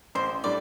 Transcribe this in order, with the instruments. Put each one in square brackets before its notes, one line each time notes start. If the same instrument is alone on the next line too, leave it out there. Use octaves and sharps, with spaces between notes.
[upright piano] A1 [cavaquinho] C5
[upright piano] A2 G3 D4 [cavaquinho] D5